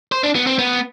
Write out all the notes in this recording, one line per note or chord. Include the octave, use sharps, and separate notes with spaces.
C5
D4
B3
C4
B3